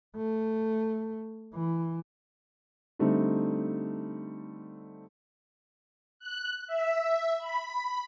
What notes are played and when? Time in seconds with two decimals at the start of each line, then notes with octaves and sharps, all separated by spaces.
0.17 A3
1.54 E3
2.99 D3 G3 A3 C4 D#4
6.19 F#6
6.67 E5
7.38 B5